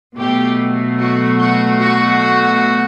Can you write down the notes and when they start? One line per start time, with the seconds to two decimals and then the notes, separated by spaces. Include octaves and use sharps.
0.17 B2 F#3 A3 G4
0.99 F#4
1.39 F#4
1.80 F#4